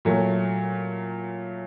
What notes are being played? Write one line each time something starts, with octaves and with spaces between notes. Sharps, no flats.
A#2 F#3 A3